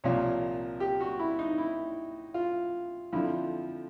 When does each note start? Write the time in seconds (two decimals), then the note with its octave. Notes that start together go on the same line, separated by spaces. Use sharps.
0.04 C2 A#2 F3 C#5
0.80 G4
1.00 F#4
1.19 E4
1.39 D#4
1.58 E4
2.34 F4
3.12 F2 D3 F3 E4